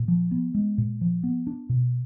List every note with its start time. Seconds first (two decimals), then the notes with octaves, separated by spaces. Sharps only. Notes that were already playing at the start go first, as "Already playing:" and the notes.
Already playing: A#2
0.08 F3
0.31 B3
0.55 G#3
0.78 A#2
1.01 F3
1.23 B3
1.47 D4
1.69 B2